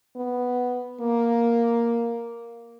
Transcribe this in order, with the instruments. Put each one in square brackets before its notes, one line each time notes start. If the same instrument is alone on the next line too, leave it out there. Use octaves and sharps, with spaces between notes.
[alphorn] B3
A#3